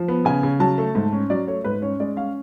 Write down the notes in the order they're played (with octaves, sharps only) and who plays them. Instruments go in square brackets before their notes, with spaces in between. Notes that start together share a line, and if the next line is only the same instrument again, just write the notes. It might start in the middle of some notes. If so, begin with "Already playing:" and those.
Already playing: [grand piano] F3
B3
C#3 G#5
C#3
F#3 A5
A3
G#2
C#4
F#3 D5
A3 C#5
G#2 B4
C#4 C#5
G#3 D5
C#4 F5